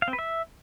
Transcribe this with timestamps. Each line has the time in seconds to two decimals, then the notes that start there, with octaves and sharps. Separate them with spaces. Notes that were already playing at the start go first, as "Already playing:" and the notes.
0.02 F5
0.08 C4
0.13 B4
0.19 E5